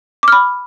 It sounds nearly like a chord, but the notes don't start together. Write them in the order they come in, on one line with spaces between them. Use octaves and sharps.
D6 F6 B5